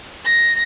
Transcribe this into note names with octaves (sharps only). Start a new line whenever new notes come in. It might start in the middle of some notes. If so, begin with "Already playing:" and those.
A#6